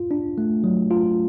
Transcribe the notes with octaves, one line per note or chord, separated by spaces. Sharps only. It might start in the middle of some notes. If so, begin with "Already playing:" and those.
Already playing: F4
D4
A3
F#3
F4